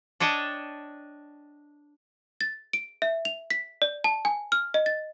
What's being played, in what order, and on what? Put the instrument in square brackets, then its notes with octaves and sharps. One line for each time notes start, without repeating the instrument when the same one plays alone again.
[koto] D4 C#5 D#5 G5 A5
[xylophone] A6
D7
E5
F7
B6
D5
A5
G#5
F6
D#5
A6